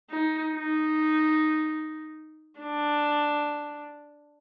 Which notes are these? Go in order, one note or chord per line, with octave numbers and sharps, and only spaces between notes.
D#4
D#4
D4